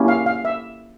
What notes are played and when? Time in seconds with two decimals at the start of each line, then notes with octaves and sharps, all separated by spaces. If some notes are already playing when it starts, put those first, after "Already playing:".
Already playing: A#3 C#4 E4 G4
0.08 F5
0.26 F5
0.45 E5